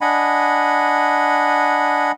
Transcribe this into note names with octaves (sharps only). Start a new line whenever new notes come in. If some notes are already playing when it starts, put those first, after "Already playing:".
D4 D#5 F#5 G#5 B5